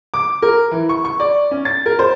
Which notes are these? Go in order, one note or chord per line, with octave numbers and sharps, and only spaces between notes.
D6
A#4
E3
C#6
C#6
D5
C#4
A6
A#4
C5